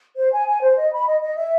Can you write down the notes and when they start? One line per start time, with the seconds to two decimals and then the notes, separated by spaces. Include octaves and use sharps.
0.16 C5
0.32 G#5
0.47 G#5
0.61 C5
0.77 D#5
0.92 B5
1.07 D#5
1.21 D#5
1.37 E5